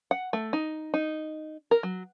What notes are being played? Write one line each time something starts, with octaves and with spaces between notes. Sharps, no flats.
F#5
A3
D#4
D#4
A#4
F#3